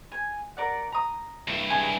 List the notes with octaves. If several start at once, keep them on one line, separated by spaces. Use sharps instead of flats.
G#5
A#4 D5 F#5
A#5 D#6
G2 E4
G#4